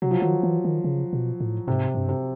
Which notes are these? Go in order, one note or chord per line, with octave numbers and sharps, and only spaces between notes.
C3 F#3
F3
D#3 F#3
E3
D#3
C#3
B2
A2
G#2 C3
G2
C3